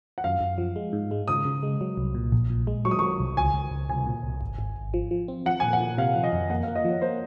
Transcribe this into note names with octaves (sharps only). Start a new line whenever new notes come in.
F#5
F#2 F5
F#2
F3
G#3
G#2
G#3
C#3 D#6
C#3
G#3
F#3
C2
A#2
A#1
A#2
G#3
F#3 C#6
D#6
F#3 C#6
C2
C#2 G#5
C#2
C#2
C2 G#5
A#2
C2
G#1
G#1
G#1
F3
F3
C4
F3 F#5
A#2 G#5
F#5
A#2
C3 F5
F3
D#5
F2
A#3 F#5
F5
A#3
D#5
F3
C#5
A#3 C5